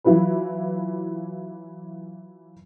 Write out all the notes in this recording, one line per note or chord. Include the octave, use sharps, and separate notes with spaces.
E3 F#3 E4 F4 B4